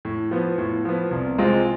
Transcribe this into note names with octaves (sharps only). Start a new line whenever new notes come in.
A2
F3 B3
A2
F3 B3
C2
C3 G#3 C4 F4